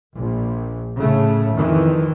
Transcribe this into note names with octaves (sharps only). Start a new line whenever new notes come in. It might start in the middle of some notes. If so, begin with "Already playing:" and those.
A#1
A2 C#3 A3
F2 D#3 E3